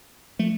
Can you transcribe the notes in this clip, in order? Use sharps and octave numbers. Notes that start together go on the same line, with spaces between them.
F3 A3